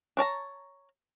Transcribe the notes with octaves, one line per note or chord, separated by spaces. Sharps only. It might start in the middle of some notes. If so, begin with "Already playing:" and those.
D4 C#5 A5 A#5